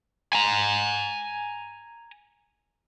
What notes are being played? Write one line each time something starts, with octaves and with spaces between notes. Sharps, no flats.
G#5 A#5